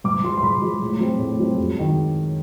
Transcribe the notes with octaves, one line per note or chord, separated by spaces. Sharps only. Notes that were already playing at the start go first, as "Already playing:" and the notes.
G#2 D6
F3 G#3 C6
C6
G#2 B5
F3 G#3
A2
F3 G#3 C4
A2
F3 G#3 C4
F#2
D#3 G#3